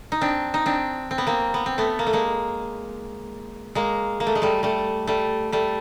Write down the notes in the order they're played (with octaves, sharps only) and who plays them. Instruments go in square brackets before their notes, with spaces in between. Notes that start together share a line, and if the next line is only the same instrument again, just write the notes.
[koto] D#4
C4 D4
D#4
C4 D4
C4
B3
A#3 C4
B3
C4
A3 B3
A#3
A3
G#3 A#3
G#3 A#3
A#3
A3
G#3
G3 A3
G3 A3
G3 A3
G3 A3